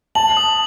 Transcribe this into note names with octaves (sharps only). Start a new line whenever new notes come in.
A5 F#7
D#6